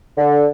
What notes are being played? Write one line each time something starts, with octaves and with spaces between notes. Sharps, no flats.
D3